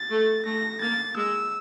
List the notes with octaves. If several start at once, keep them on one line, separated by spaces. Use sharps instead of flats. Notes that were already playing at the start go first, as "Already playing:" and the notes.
Already playing: A6
A3
A3 A#6
A#3 A6
G#3 E6